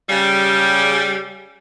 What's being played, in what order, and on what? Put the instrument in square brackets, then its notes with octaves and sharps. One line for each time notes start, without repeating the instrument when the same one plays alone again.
[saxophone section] C#3 G3